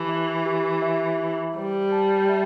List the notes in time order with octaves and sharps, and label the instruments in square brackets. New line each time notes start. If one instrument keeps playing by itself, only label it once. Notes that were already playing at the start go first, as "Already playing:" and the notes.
Already playing: [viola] E3 [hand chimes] G4 A5
[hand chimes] E5
G4
E5
E4
[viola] G3 [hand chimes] C5
[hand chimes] A5
E5